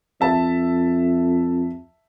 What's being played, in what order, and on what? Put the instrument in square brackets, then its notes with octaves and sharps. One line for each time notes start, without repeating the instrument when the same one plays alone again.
[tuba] F2 [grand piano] E5 A5